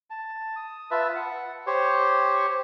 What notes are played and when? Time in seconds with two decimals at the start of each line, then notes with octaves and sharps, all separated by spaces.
0.10 A5
0.56 D#6
0.91 F4 B4 E5 A5
1.16 F#5
1.67 G4 C5 C#5